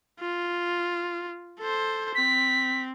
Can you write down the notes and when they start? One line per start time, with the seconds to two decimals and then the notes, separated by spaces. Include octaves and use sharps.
0.20 F4
1.59 A4 C5
2.15 C4 B6